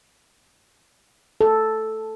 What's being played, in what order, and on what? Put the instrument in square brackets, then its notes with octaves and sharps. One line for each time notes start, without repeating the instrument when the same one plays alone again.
[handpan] A4